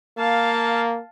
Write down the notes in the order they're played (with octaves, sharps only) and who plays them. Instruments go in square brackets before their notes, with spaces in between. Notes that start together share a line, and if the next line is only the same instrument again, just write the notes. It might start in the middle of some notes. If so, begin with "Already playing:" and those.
[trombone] A#3 [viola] F5 A5